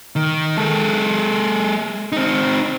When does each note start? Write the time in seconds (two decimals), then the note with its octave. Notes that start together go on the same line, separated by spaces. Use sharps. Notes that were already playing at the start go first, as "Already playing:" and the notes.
0.16 D#3
0.57 G#3 A4
2.12 C4 D#4